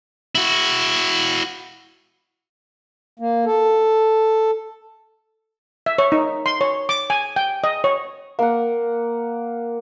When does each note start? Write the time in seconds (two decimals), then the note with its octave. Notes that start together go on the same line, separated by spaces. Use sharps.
0.35 E4 F#4
3.19 A#3
3.45 A4
5.86 E5
5.98 C#5
6.12 D#4
6.46 C6
6.61 C#5
6.89 D6
7.10 G#5
7.36 G5
7.64 D#5
7.84 C#5
8.39 A#3 F#5